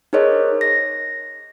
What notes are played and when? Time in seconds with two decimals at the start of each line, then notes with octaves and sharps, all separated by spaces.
0.13 D#4 G#4 A#4 C5 C#5 D#5
0.61 A#6